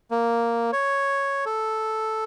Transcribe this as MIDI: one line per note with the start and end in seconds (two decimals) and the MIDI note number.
0.11 0.71 58
0.73 1.45 73
1.46 2.24 69